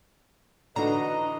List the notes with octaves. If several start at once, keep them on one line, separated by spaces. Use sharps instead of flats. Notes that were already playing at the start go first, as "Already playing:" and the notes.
D3 E3 D4 D#4 F#4 B4 D#5 A#5